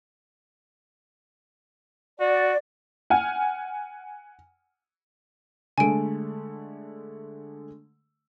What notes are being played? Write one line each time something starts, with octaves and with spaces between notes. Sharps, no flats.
F#4 D5
F#5 G#5 F6
D3 G#3 A3 G#5 D7